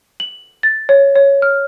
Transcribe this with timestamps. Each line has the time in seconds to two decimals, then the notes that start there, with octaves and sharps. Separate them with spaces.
0.20 F#7
0.63 A6
0.89 C#5
1.16 C#5
1.42 F6